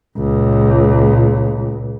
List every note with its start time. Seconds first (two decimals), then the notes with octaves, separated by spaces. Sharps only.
0.17 C#2 A#2